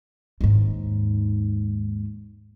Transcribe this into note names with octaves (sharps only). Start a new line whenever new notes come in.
D#2 G#2